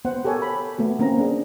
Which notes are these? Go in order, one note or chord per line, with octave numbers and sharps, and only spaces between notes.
B3 C5 F#5
G4 A4 A#4 C#5 G#5
B5
A3 B3 F#4
A#3 C4 C#4 A#5
D4 G#4